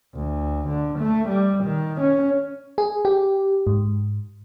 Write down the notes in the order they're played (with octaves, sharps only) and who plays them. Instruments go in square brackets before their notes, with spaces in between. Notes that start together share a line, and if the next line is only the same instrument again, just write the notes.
[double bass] D2
D3
A3
G3
D#3
C#4
[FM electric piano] G#4
G4
G#2